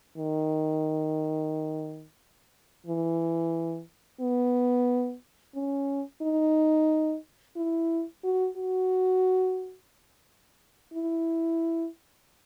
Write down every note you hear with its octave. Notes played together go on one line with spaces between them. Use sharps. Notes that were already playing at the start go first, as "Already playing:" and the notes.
D#3
E3
B3
C#4
D#4
E4
F#4
F#4
E4